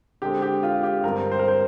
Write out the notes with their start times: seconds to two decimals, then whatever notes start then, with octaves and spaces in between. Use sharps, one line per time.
0.22 D3 G#3 C4 G4
0.42 G4
0.63 F4
0.83 G4
1.04 G2 D3 G3 C4 A#4
1.32 C5
1.39 A#4
1.48 C5